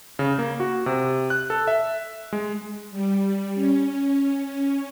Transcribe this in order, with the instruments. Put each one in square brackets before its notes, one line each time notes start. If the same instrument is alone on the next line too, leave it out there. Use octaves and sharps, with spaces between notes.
[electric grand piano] C#3
A#3
F#4
C3
F#6
A4
E5
G#3
[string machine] G3
C#4